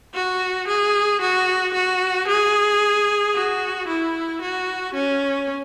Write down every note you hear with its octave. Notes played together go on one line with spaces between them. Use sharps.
F#4
G#4
F#4
F#4
G#4
F#4
E4
F#4
C#4